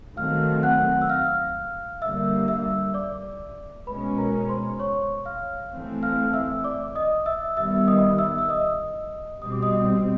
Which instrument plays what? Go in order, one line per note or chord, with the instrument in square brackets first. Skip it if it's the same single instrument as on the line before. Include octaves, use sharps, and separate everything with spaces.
[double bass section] D#3 F#3 A3 C4 [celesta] F5 F6
[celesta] F#5 F#6
E6
F5 F6
[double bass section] D3 G3 A#3 [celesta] E5 E6
[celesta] E5 E6
D5 D6
[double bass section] B2 G#3 C#4 [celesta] B4 B5
[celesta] A#4 A#5
C5 C6
C#5 C#6
F5 F6
[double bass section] E3 A3 C4
[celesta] F5 F6
E5 E6
D5 D6
D#5 D#6
E5 E6
[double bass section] D#3 G3 B3 [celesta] E5 E6
[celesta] D#5 D#6
E5 E6
E6
D#5 D#6
[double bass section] B2 G3 C4 [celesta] D#6
[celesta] D6
D#5 D#6